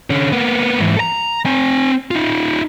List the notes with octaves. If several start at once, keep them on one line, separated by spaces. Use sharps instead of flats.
D3 C#4
A#3 B3
G#2 E3
A4 A#5
C4 G#5
D#4 F4